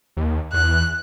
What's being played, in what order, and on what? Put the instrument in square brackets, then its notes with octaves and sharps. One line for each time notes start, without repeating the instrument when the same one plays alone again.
[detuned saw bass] D#2
[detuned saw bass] E2 [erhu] F#6